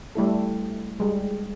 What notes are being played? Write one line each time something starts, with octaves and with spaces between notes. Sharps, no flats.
G3 A3 E4 A4
G3 G#3